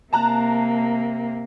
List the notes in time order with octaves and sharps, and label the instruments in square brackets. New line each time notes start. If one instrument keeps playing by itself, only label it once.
[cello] C3 A#3 [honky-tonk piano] A5 A#5 F#6